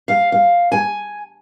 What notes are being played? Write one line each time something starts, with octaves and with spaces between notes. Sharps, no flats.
F5
F5
G#5